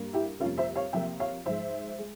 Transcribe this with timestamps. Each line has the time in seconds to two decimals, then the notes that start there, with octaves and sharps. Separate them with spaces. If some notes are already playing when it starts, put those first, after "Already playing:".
Already playing: G2 G3 A#3
0.13 E4 G4
0.40 F2 C3 G3 A#3 C#4 F4
0.57 C5 E5
0.75 C#5 F5
0.93 C3 F3 A#3 E5 G5
1.20 C#5 F5
1.45 G#2 F3 G#3 C5 E5
1.99 G#3